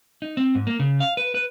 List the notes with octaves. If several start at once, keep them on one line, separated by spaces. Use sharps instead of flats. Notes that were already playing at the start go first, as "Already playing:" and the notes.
D#4
C4
G#2
A#3
C#3
F5
B4
B4